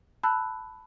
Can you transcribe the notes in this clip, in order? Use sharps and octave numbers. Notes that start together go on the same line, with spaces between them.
A5 B5 E6 F#6